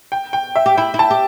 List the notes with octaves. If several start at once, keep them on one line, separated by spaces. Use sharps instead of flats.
G5
G5
E5
G4
E4 G5
E4
A5
G4